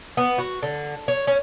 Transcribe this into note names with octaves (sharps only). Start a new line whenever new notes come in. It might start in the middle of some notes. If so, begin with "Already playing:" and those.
B3
F#4
D3
C#5
C#4